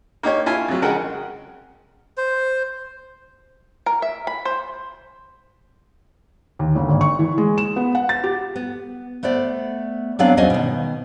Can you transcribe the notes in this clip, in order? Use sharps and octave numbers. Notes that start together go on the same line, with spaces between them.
A#3 D#4 G4 C#5
E4 F4 G#5
F2 F#3
C#3 G#3 A#4 F#5 G5
C5
A#4
E5
B5
C5
D#2
G1
G#1
C#6
E3
G#3
E7
B3
F#5
A6
G4
B3
A3 B3 C5 D5
F#3 B3 C4 D4 D5 F5
E2 F#3 C#4 C5 D#5 G#5
B2 D#3